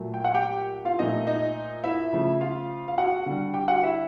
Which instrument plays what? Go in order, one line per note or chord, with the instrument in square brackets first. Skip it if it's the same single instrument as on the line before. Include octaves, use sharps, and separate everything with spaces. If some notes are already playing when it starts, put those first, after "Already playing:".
Already playing: [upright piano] A#2 F#3 A3
G5
F#5
G4 G5
F4 F5
A#2 F3 A3 D#4 D#5
D#4 D#5
E4 E5
C#3 F3 A3
F4 F5
F5
F#4 F#5
D3 G3
G4 G5
F#4 F#5
E4 E5